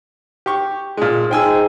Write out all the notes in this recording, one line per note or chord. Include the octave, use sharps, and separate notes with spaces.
G4 C#6
A#2 G#3
D#4 G#4 C5 G5 G#5 E6